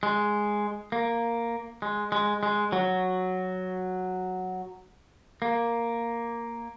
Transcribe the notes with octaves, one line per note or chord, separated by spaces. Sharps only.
G#3
A#3
G#3
G#3
G#3
F#3
A#3